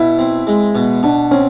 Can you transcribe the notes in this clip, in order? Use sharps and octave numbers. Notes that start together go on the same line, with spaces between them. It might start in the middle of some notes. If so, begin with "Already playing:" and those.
Already playing: B2 E4
C4
G#3
B2
B2 D4
C4 C#4